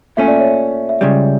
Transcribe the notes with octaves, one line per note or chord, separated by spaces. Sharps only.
A#2 A3 C#4 E5
D5
C#5
D5
E5
C#2 C#3 G3 D5